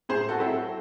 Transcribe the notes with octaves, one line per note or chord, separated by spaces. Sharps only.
A2 G#4 C5
F#4 A4
F#3 A3 C4 E4